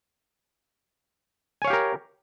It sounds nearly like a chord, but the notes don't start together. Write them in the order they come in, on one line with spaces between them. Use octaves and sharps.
G#5 C#5 F5 G4 A#4